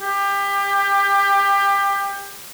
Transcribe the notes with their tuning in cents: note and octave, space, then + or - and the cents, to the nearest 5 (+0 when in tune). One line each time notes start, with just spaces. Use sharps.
G4 +25